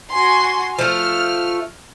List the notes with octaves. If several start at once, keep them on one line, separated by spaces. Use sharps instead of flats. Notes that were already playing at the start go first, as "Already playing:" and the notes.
F#4 G#5 C6
F3 A3 F6